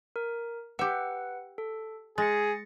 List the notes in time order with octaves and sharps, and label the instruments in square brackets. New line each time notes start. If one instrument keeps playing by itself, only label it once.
[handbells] A#4
[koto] G4 E5 [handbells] B4 F#5
[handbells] A4
[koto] G#3 [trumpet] G#4 [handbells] A6 A#6 C#7